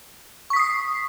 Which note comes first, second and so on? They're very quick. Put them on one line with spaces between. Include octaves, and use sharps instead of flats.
C#6 B6 D#6 C7